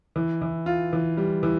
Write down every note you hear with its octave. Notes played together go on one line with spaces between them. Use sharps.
E3
E3
F4
E3
G3
E3